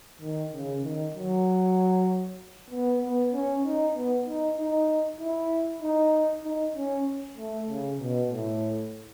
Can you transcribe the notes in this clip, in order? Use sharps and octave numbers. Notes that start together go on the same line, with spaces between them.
D#3
C#3
D#3
F#3
B3
B3
C#4
D#4
B3
D#4
D#4
E4
D#4
D#4
C#4
A3
C#3
B2
A2